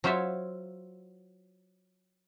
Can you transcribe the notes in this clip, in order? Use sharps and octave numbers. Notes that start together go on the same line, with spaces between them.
F#3 F4 C5 C#5 E5